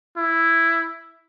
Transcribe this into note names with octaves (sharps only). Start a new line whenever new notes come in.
E4